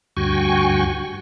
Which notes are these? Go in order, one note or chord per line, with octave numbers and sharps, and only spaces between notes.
D2 G2 F#4 G5 G#5 C#6